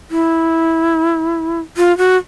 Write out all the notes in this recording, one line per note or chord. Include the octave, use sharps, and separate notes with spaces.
E4
F4
F#4